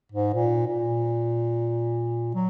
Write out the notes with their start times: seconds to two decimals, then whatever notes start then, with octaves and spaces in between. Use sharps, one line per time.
0.12 G#2
0.34 A#2
0.67 A#2
2.35 F#3